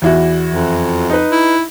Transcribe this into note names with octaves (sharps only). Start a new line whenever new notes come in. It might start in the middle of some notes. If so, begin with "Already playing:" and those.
E2 E4 F#4
F2
D#4 B4
E4